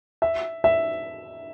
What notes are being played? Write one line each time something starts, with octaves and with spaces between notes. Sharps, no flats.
E5
E5